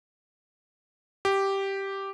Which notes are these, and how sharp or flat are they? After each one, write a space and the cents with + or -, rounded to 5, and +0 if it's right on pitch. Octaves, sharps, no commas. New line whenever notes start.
G4 -5